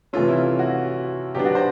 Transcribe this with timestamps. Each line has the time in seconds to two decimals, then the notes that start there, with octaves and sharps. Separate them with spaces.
0.13 C3 E3 A3 C#4 F4
0.28 E4
0.59 F#4
1.35 B2 F#3 B3 D4 G4
1.45 F#4
1.55 C5